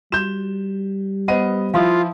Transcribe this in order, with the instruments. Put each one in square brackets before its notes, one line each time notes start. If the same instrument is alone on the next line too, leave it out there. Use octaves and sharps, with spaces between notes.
[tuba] G3 [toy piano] F#4 [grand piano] G6 E7
[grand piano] B3 D#5 D#7 [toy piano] B4 C5 F#5
[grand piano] F3 E4 [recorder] F4 [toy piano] F5 C6 D#6